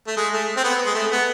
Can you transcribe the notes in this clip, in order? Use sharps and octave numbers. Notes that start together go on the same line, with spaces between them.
A3
G#3
A3
C4
B3
G#3
A3
B3